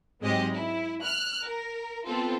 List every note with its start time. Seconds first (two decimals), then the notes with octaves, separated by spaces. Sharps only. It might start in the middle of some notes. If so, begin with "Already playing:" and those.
0.20 G#2 F#3 G#3 C4 G4 D#5
0.52 E4
1.02 F6 F#6
1.42 A#4
2.05 B3 C4 F4 A4